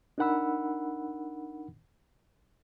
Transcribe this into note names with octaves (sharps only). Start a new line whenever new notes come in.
D4 D#4 A#4 F#5 B5 E6